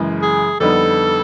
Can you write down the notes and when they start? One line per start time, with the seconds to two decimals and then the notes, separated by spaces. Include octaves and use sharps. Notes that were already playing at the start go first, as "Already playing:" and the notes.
Already playing: F#2 C#3 E3 G#3
0.22 G#4
0.60 F2 D3 G3 B3 D#4 A4